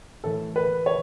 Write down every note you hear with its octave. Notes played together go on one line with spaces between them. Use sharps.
A2 E3 A4
B4
C#5